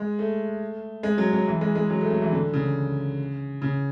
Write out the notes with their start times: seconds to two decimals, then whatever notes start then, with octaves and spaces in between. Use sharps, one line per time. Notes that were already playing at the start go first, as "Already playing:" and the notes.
Already playing: G#3
0.19 A3
1.03 G#3
1.18 F#3
1.33 F#3
1.47 E3
1.61 G#3
1.75 G#3
1.90 F#3
2.01 A3
2.10 F#3
2.22 E3
2.32 D3
2.53 C#3
3.62 C#3